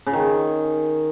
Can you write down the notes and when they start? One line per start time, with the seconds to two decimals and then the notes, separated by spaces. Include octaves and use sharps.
0.07 C#3
0.13 D#3